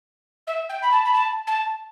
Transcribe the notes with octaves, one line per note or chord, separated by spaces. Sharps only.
E5
G5
B5
A5
B5
A5
A5